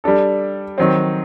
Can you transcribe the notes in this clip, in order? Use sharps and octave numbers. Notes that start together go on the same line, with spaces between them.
G3 D4 A4
D#3 F#3 C4